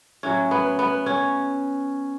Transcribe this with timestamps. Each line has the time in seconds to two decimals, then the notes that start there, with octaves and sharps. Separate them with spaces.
0.23 A2 F#3 C#4
0.51 B3
0.79 B3
1.06 C#4